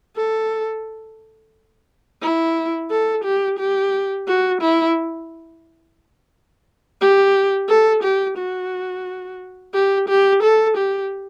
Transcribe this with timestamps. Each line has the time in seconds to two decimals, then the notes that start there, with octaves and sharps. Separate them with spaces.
0.16 A4
2.22 E4
2.90 A4
3.24 G4
3.59 G4
4.27 F#4
4.61 E4
7.01 G4
7.69 A4
8.03 G4
8.38 F#4
9.74 G4
10.09 G4
10.43 A4
10.77 G4